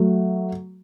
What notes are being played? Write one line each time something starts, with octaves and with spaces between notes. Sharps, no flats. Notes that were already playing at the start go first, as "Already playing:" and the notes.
Already playing: F#3 A3